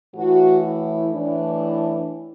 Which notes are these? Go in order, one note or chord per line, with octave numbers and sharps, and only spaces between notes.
A2 E3 F#4
E4
A2 E3 D4